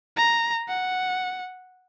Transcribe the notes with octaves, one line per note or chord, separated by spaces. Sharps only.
A#5
F#5